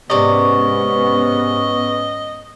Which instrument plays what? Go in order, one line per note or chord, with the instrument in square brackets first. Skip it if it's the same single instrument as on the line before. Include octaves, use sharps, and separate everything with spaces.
[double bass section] G#2 B3 C#4 [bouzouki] C3 D5 [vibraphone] B4 C#6 [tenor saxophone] D#5